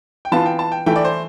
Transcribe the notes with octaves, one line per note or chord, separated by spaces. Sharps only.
G5
E3 B3 F4 A5
G5
A5
G5
E3 A3 E4 G5
D5
C5